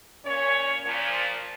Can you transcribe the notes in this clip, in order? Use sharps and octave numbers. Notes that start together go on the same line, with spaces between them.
A#2 C#4 C#5
A#2 F3